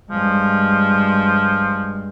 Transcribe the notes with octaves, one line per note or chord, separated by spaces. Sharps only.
G2 F3 G#3